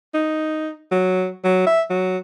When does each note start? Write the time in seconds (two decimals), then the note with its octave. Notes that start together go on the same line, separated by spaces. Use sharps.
0.14 D#4
0.92 F#3
1.44 F#3
1.67 E5
1.90 F#3